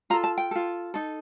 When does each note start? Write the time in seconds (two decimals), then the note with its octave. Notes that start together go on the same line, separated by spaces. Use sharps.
0.10 F4 A#5
0.13 A4
0.24 A5
0.38 G5
0.51 F4 A4
0.94 D#4 A4